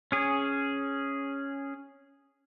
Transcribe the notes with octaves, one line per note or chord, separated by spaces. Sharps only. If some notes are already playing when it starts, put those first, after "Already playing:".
C#4 G#4